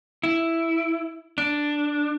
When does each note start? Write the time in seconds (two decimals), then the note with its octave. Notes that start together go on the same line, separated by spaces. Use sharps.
0.23 E4
1.38 D4